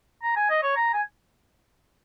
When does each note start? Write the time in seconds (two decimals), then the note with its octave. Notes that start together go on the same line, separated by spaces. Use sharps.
0.23 A#5
0.36 G#5
0.50 D#5
0.63 C#5
0.76 A#5
0.94 G#5